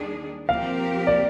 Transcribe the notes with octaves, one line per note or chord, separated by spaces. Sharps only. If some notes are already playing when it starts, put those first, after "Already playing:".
Already playing: D#2 D#3 G3 D4 G#4
F3 C4 G4 A#4 F5
D5